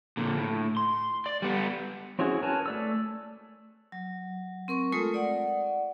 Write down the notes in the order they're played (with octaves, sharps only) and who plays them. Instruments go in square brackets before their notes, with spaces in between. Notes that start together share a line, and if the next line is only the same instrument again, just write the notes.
[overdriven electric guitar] A#2 D3
A2
C6
D5
G3 B3
[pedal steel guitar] C4 C#4 E4 F#4 G#4
A#4 B4 C#5 G#5 A5
A3 D5 E6
[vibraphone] F#3
C4 A#4 C#6
G#3 A3 F4 A4 A#4 D#6
D5 F#5